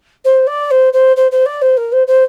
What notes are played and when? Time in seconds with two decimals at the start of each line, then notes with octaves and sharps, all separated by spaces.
0.24 C5
0.47 D5
0.71 C5
0.93 C5
1.16 C5
1.31 C5
1.46 D5
1.62 C5
1.77 A#4
1.92 C5
2.07 C5